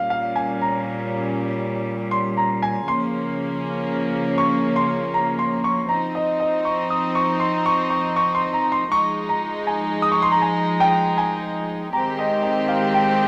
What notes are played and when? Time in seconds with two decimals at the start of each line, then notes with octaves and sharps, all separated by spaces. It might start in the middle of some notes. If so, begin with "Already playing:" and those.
Already playing: A#2 G3 C#4 F5
0.10 F5
0.36 G#5
0.62 A#5
2.11 C6
2.37 A#5
2.62 G#5
2.87 C#3 F3 A#3 C#4 C6
4.38 C#6
4.76 C6
5.14 A#5
5.39 C6
5.64 C#6
5.89 F3 C4 D#4 A#5
6.15 D#5
6.40 D#5
6.65 C#6
6.90 D#6
7.15 C#6
7.40 C6
7.66 C#6
7.90 C#6
8.16 C#6
8.35 C6
8.53 A#5
8.72 C6
8.92 F3 G#3 D#4 C#6
9.29 A#5
9.67 G#5
10.02 D#6
10.12 C#6
10.22 C6
10.32 A#5
10.42 G#5
10.80 G5
11.18 G#5
11.93 D#3 G#3 C4 G4 A#5
12.19 D#5
12.43 D#5
12.68 F5
12.94 G5